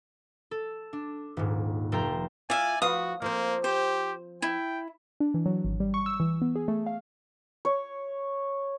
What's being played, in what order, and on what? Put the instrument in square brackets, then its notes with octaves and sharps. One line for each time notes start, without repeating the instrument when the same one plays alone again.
[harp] A4
D4
D#1 G#2
F1 A4 G5 A#5 C6 G6
[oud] F4 [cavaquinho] D5 E5 [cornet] G#5
[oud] F3 B4 F5 [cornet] F#4 [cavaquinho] D#6
[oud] F3 C4 [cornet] A#3
[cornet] G4 [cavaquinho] C5
[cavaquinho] E4 [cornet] G5
[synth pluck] D4
E3
F#3
G#1
G3
C#6
E6
E3
B3
G#4
A3
F5
[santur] C#5